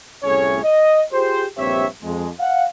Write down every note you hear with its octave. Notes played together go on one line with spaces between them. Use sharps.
C2 A2 A3 C#4 G#4 C#5
D#5
F4 G4 G#4 C5
A#1 G2 C4 G4 C#5 E5
F2 G#3
F5 F#5